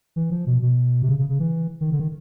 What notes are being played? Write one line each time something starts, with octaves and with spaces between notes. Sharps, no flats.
E3
F3
B2
B2
C3
C#3
C#3
C#3
E3
D#3
D3
D#3